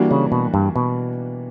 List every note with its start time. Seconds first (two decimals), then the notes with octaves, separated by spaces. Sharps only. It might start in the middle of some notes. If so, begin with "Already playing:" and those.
Already playing: E3 G3 A#3 D4 F#4
0.11 C#3
0.32 B2
0.54 G2
0.76 B2